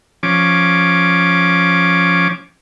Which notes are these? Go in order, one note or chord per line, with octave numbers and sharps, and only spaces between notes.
F3 C#4 D6